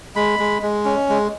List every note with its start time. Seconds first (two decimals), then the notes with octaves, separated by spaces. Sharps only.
0.16 G#3 B5
0.39 G#3
0.62 G#3
0.85 C#4
1.09 G#3